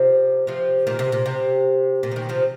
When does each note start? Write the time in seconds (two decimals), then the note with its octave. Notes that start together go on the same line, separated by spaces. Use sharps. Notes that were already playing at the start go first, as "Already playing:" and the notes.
Already playing: C3 F3
0.47 C3 F3
0.87 A#2 D#3
0.99 C3
1.12 A#2
1.26 C3
2.03 A#2
2.12 F3
2.16 A#2 D#3
2.29 C3 F3